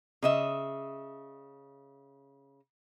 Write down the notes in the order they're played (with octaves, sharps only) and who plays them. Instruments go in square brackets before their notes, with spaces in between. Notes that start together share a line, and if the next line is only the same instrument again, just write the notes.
[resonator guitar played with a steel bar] C#3 D#5 E5